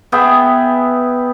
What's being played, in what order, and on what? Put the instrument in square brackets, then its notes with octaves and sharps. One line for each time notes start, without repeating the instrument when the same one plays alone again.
[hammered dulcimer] B3 G#4 E5 G5